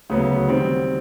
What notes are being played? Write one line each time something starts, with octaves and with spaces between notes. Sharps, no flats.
D2 C#3 F#3 B3
D#3 G3 C4